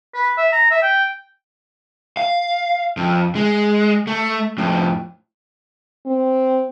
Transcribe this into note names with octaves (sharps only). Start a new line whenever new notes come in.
B4
E5
A#5
E5
G5
F5
F2
G#3
A3
F2 A2
C4